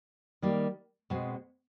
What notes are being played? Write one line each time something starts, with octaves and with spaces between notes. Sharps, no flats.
D#3 G3 A#3
B2 G#3 C4